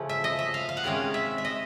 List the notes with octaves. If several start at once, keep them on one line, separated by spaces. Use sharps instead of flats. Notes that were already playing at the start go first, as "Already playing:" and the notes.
Already playing: C#3 F3 A3 C#4
E5
D#5
E5
F5
F5
F#5
C3 D#3 G#3 C#4 F5
E5
E5
D#5